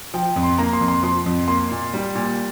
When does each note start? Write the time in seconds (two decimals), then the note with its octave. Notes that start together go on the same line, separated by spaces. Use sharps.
0.14 F3 G5
0.36 F2
0.43 C6
0.58 A#3 A#5
0.73 C6
0.81 F2
0.88 C6
1.03 F3 C6
1.26 F2
1.48 A#3 C6
1.71 A#2
1.94 G3
2.15 A#2